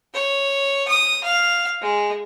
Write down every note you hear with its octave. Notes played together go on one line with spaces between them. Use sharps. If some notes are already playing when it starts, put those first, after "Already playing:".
C#5
D#6
F5
G#3